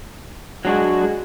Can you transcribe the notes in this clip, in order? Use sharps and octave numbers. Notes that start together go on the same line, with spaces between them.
F#3 G#3 D4 F#4